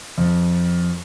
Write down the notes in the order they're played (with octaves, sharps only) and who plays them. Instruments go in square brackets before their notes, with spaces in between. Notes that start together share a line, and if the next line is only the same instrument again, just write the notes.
[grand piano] F2